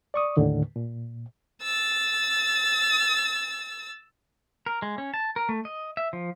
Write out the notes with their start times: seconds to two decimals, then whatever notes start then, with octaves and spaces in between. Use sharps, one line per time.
0.14 D5 C#6 D#6
0.37 D#2 A2 D3 D#3
0.76 A#2
1.63 E6 A6
4.66 A#4
4.82 G#3
4.98 C#4
5.14 A5
5.36 A#4
5.49 A3
5.65 D#5
5.97 E5
6.13 F3